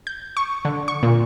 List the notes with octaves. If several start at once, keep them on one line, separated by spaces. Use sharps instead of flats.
G6
C#6
D3
C#6
A#2